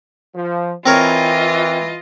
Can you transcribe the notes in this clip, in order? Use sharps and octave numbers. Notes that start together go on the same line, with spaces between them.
F3
E3 C4 F4 A#4 C#5 D#5